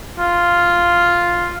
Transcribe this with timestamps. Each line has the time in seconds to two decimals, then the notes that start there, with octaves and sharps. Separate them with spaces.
0.19 F4